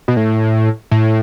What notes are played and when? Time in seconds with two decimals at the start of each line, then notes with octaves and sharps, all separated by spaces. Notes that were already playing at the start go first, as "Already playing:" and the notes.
0.08 B2
0.17 A2
0.91 A2